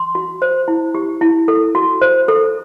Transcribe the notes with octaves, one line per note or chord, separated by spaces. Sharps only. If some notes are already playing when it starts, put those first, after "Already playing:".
Already playing: C6
F#4
C5
E4
G4
E4
A4
F#4
C5
A4